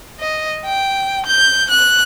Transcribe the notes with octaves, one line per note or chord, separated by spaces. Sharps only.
D#5
G5
G6
F#6